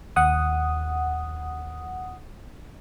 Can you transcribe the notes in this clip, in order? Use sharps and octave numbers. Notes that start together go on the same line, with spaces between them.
D#2 F#5 D#6